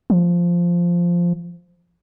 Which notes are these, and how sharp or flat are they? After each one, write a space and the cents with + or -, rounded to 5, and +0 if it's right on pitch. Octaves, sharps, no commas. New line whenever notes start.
F3 -5